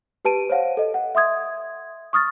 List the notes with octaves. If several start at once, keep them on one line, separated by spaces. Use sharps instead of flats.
G4 B4 A5 D7 D#7
C5 C#5 F5 F#5
A4 D#5
F#5
E5 C6 D#6 G#6
C#6 D#6 F6 A6